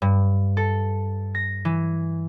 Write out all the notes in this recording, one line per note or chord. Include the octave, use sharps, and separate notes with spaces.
G2
A4
A#6
E3